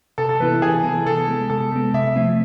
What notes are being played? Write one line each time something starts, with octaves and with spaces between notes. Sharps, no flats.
C3 A4
A4
E3 B3 E4 B4
C3 G#4
E3 B3 E4
C3 A4
G#3 B3
C3 A4
G#3 B3
C3 E5
F3 A3 C4